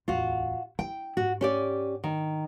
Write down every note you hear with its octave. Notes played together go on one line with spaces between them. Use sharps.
D1 E2 F4 F#4
E4 G5
G#2 F#4
C#4 G4 D5
D#3